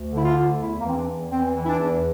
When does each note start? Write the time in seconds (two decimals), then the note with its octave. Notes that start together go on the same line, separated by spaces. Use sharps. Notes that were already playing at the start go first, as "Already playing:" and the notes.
Already playing: D2
0.11 D3
0.18 E4
0.24 F4
0.36 D2
0.59 E2 E4
0.80 A#3
0.84 E3 C4
0.95 D4
1.07 E2
1.32 E3 C4
1.55 E3
1.64 E4
1.68 D4
1.80 E2